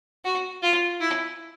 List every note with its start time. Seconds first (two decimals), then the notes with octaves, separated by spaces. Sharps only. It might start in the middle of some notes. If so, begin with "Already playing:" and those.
0.25 F#4
0.63 F4
1.00 E4